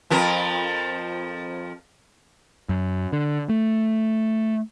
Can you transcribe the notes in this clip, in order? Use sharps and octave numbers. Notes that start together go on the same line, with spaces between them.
F2 F3 A#4
F#2
D3
A3